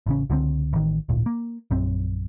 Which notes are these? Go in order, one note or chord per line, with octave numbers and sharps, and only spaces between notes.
A1 C#3 C#4
C#2 D3 F#3 C4
A1 D#3
D1 G#1 A#2
A#3
A#1 F#2 C4